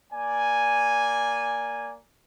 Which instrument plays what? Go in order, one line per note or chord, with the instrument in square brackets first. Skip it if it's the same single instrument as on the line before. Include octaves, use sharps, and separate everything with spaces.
[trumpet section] A#3 D5 G#5